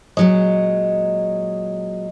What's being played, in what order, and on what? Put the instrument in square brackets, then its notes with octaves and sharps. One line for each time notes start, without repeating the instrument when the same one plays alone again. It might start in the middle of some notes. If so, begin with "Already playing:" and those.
[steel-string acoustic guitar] A#2 F#3 G#3 [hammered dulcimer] D#5